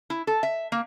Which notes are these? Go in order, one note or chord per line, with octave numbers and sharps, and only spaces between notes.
E4
A4
E5
A#3